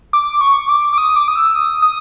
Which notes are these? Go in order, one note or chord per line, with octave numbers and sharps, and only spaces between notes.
D6
C#6
D6
D6
D#6
D6
D#6
E6
D#6
D#6